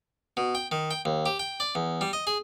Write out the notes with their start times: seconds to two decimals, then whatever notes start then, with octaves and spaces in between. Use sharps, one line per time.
0.37 B2
0.55 G5
0.72 D#3
0.91 G5
1.05 D#2
1.26 G4
1.39 G5
1.60 D5
1.75 E2
2.01 G3
2.13 D#5
2.27 G#4